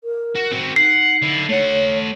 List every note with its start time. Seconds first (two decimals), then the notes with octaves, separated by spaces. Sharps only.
0.04 A#4
0.35 F#4
0.52 C4 F#4
0.76 D#4 F#5 C7
1.22 D3 E4
1.49 A3 C#5 F#5